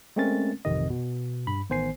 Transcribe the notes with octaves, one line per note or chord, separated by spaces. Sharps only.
G#3 A3 C4 C#4 A#4 A6
A1 F2 C3 D#3 D#5
B2
G2 B5
A1 D#3 B3 C5 G#5 C7